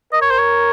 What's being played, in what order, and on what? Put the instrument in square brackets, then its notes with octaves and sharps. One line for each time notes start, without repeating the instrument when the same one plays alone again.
[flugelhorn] A#4 [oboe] D#5
[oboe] C#5
C5
C#5